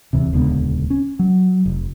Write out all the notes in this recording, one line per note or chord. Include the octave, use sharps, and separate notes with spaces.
D#1 E2 C3
D#1 C#2 D3 B3
C#4
F#3
F1